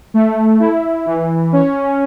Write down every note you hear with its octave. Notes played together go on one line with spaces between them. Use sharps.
A3
E4
E3
C#4